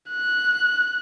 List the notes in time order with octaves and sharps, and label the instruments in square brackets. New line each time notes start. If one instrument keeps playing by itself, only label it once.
[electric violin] F#6